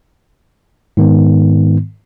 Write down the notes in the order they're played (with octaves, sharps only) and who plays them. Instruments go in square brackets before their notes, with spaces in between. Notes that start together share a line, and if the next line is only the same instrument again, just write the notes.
[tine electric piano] G#2 D#3 B3